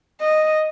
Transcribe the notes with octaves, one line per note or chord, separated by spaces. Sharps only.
D#5